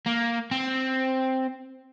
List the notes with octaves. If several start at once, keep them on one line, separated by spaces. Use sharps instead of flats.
A#3
C4